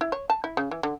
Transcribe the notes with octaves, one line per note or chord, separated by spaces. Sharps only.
E4
C#5
A5
E4
C#3
E3
D3